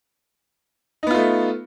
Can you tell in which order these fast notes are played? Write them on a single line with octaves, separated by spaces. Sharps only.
D#4 B3 F4 A3